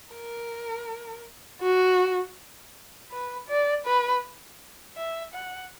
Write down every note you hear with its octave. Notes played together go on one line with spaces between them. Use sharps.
A#4
F#4
B4
D5
B4
E5
F#5